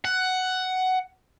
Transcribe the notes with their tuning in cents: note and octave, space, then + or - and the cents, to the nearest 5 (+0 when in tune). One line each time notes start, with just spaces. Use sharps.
F#5 +10